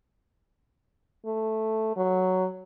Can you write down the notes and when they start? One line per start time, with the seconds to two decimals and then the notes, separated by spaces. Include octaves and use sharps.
1.26 A3
1.97 F#3